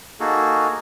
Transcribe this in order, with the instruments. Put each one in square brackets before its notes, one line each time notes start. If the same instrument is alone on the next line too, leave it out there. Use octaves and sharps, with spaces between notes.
[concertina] A#3 D#4 F#4 G#4 A4